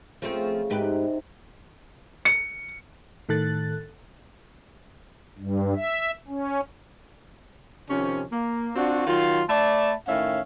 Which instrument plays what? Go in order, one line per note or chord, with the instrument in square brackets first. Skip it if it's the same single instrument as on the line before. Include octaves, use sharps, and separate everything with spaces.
[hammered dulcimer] C#3 [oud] F3 A3 C4
[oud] G#2 G4 B4 [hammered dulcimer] C3 D#3 D#4
[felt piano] C#7
[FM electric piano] A2 D#3 A4 F#6 A6
[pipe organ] G2
E5
C#4
[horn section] C3 D#3 F3 C#4
A#3
C4 D4 F4 F#4
D#3 F#3 F4
A3 D5 E5 A5 B5
A2 D#3 C#4 E5 F5